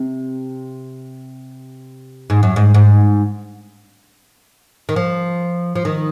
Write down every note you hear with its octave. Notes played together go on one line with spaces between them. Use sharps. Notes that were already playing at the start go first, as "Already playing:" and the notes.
Already playing: C3
G#2
F#2
G#2
G#2
D#3
F3
F3
D#3